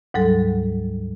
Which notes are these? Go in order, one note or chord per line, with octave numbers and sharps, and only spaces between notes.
D2 G#2 F#3 G3 A4